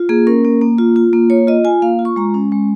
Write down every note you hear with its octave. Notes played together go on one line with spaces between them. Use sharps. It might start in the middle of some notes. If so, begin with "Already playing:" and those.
Already playing: F4
A#3 G#4
C#4 A#4
A#3
A#3
F4
F4
A#3
A#3 C#5
F4 D#5
F4 G#5
A#3 F5
F4
C#6
G#3 A#5
C#4
G#3